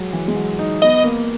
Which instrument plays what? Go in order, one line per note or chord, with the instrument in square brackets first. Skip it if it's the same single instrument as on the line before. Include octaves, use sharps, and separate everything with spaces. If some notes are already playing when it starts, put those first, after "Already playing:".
Already playing: [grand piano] F#3 G#3
E3
G#3
F#3
D#4
[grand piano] B3 [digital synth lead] D#5
[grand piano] A#3